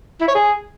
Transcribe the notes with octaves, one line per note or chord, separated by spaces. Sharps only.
E4
C#5
G#4